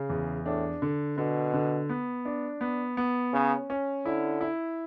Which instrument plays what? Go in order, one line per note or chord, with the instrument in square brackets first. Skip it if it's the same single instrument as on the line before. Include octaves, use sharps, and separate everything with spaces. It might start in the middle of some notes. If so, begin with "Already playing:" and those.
Already playing: [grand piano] C#3
E2
[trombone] A2 [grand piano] D4
[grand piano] D3
[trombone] B2 [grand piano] D3
[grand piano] D3
B3
D4
B3
B3
[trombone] C#3 [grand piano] C#4
[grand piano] C#4
[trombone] D3 [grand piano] E4
[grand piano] E4